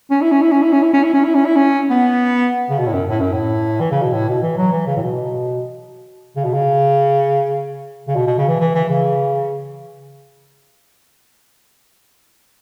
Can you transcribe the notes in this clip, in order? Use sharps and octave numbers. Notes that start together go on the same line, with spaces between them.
C#4
E4
C#4
E4
C#4
E4
C#4
E4
C#4
E4
C#4
E4
C#4
E4
C#4
B3
C#3
B2
A2
F#2
A2
F#2
A2
E3
C#3
B2
A2
B2
E3
F#3
E3
C#3
A2
B2
C#3
B2
C#3
C#3
B2
B2
C#3
E3
E3
E3
C#3